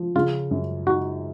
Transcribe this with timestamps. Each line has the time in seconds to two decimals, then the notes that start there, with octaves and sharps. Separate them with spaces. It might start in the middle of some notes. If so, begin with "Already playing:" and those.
Already playing: F3
0.15 C#3 F4
0.51 F#2
0.87 D#4 F#4